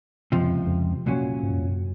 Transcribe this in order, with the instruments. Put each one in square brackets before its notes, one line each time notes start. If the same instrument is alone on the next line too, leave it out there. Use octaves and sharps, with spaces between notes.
[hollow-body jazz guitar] C#2 C3 F3 [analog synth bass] F#2
[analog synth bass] F2
F2
[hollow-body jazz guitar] C2 A#2 F#3 C#4 [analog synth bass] F#2
[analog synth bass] G#2
F#2
F2
F#2